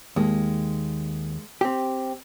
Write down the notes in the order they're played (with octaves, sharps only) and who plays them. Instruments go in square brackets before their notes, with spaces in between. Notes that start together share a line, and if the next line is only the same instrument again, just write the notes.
[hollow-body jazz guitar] D#2 [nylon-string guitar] G#3 A#3
[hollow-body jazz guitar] C4 G4